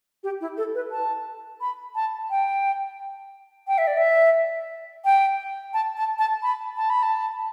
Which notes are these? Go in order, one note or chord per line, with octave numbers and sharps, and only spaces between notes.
G4
E4
A4
B4
A5
B5
A5
G5
G5
E5
D5
E5
G5
A5
A5
A5
B5
A5
B5
A5